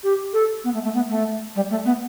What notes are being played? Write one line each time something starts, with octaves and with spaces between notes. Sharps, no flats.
G4
A4
B3
A3
A3
B3
A3
G3
A3
B3